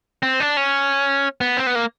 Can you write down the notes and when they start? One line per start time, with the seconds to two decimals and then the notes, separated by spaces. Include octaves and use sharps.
0.23 C4
0.40 D4
0.57 C#4
1.41 B3
1.57 C4
1.67 B3
1.75 A#3